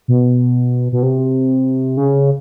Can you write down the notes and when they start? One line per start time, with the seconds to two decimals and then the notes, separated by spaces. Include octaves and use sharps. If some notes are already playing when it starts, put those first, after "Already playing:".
0.08 B2
0.92 B2
1.03 C3
1.97 C#3